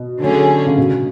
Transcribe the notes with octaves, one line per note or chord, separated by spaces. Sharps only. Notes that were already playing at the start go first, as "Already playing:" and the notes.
Already playing: B2
D3 F#3 A3 C#4 G#4
C#3
B2